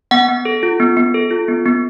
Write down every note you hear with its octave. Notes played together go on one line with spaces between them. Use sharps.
B3 F#5
B3
A4
F4
B3
B3
A4
F4
B3
B3